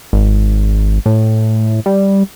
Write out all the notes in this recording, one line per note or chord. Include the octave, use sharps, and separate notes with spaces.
G#1
A2
G3